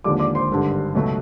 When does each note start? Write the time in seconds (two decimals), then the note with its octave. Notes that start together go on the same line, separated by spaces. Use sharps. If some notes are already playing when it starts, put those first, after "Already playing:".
0.04 D#2 D3 F3 G#3 D5 D6
0.20 D5 D6
0.35 C5 C6
0.50 G#1 G2 D3
0.95 C#2 B2 F#3 A3